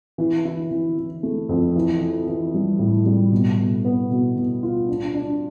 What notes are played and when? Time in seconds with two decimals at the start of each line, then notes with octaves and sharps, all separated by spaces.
0.18 E3
0.45 E4
0.71 E3
0.98 E3
1.23 A3
1.49 F2
1.76 E3
2.01 E3
2.27 E3
2.54 G3
2.79 A2
3.06 G3
3.32 B2
3.58 B2
3.85 B3
4.11 B2
4.36 B2
4.63 F4
4.88 D4
5.14 D4